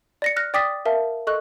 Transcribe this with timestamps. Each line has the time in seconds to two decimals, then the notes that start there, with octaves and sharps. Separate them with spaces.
0.22 D5 A#6 C#7
0.36 F6 F#6 A#6
0.54 D5 G5 D6 D#6 A6 B6
0.85 A#4 E5 F5 A5
1.27 A4 D#5 C#6 F#6